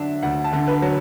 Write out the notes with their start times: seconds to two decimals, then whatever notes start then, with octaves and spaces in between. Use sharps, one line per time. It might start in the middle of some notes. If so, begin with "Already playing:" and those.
Already playing: D3 F#3 D4 E5
0.23 D2 F#5
0.44 A5
0.53 D3
0.67 B4
0.82 F#3